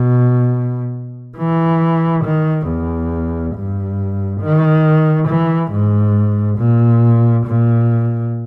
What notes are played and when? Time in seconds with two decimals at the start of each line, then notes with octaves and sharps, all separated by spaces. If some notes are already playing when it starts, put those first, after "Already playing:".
Already playing: B2
1.37 E3
2.24 D#3
2.68 E2
3.55 G2
4.41 D#3
5.28 E3
5.72 G#2
6.58 A#2
7.46 A#2